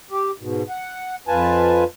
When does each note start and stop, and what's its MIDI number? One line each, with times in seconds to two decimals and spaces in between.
0.11 0.31 67
0.40 0.63 44
0.40 0.63 47
0.69 1.15 78
1.28 1.84 41
1.28 1.84 65
1.28 1.84 71
1.28 1.84 80
1.28 1.84 81